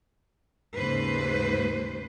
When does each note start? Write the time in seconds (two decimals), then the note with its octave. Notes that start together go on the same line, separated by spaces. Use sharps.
0.75 D#2 G#2 C#3 B4 C5